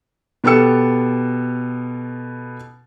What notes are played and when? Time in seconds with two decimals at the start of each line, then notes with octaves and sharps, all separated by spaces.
0.44 B2 B3 G4 A4 E6 C#7